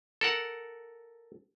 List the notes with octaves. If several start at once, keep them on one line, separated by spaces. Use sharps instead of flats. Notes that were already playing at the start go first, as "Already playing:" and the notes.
A4 A#4 F#5